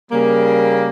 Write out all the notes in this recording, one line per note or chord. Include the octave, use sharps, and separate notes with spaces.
C#3 G3 A#3